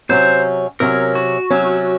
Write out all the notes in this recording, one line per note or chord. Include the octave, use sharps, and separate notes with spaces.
C3 F#3 C#4 C5
C3 F#3 C#4 A#4
F#4
C3 F#3 C#4